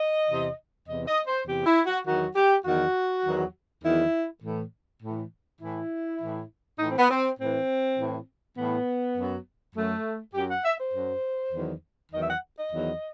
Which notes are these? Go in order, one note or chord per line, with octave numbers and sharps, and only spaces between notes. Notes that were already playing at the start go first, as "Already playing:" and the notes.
Already playing: D#5
E2 C3 E3
E2 C3 E3 D#5
D#5
C5
E2 C3 E3 G4
E4
F#4
E2 D#3 F#3 F#4
G4
E2 D#3 F#3 F#4
E2 D#3 F#3
E2 D#3 F#3 E4
A2 E3
A2 E3
A2 E3 E4
A2 E3
A2 E3 D#4
C4
B3
C4
A2 E3 C4
A2 E3
A2 E3 B3
F#2 F#3
F#2 F#3 A3
F#2 F#3 G4
F#5
E5
C5
F#2 F#3
E2 D#3 F#3
E2 D#3 F#3 D#5
E5
F#5
D#5
E2 D#3 F#3